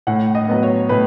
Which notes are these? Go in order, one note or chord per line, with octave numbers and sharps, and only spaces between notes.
A2 F#5
D#5
F#3 B3
C#5
A2 B4